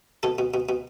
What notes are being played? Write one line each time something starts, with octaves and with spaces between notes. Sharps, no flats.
B2 A4
B2
B2
B2